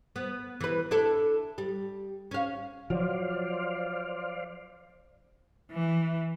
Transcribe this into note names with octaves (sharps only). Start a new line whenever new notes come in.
B3
E3 B4
D4 E4 A4
G3
C#4 F5
F3 F#3 C5 D5 F5
E3